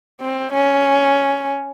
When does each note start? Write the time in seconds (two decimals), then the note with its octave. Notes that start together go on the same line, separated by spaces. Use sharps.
0.22 C4
0.53 C#4